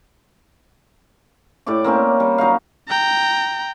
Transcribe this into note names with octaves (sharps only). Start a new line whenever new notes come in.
A2 G4 D5 D6
A#3 C4 C#4 G4
G3
F#3 D#4 F#4 F5
G5 A#5